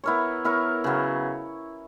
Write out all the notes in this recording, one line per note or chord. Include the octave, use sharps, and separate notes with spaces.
B3 E4 A#4 C#5
B3 E4 A#4 C#5
C#3 F#3 B3